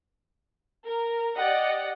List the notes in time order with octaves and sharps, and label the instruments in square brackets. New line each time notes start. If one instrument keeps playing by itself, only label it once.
[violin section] A#4
G4 D5 D#5 F#5